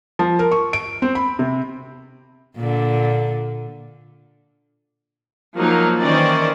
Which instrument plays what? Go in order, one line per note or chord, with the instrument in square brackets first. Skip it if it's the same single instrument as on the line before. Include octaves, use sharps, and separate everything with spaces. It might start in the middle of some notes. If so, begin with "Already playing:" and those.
[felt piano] F3
A#4
C#6
D7
C4
B5
C3
[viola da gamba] A#2 D3
[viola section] F3 F#3 A#3 D#4
D#3 E3 C#4 C5 D5 D#5